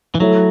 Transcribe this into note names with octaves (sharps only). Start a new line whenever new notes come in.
E3
F#3 A3 E4 A4 C#5 E5